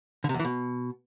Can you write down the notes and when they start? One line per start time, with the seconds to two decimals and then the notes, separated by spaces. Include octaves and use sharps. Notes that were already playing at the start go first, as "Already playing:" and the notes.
0.24 D3
0.29 C3
0.34 E2
0.39 E3
0.45 B2